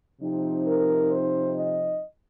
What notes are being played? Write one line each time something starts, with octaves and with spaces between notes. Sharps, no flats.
C3 F3 C4 D#4
A#4
C5
D#5